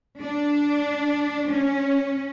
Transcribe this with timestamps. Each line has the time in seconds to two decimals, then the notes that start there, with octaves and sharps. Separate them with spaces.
0.21 D4
1.49 C#4